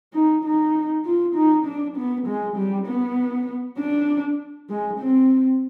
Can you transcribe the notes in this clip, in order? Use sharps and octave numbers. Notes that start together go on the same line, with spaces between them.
D#4
D#4
F4
D#4
D4
B3
G#3
G3
B3
D4
G#3
C4